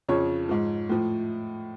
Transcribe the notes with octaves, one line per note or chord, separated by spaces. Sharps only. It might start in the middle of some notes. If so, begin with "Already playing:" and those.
F2 C#3 F3 C#5
G#2 F3
A2 F3